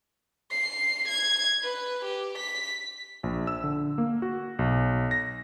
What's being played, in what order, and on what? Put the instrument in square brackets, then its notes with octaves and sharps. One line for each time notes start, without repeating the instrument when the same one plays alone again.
[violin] C7
G#6
B4
G4
B6
[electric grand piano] A#1
E6
D3
A#3
F#4
B1
A#6